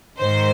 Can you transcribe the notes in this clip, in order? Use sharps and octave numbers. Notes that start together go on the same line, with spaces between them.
G#2 D#3 C5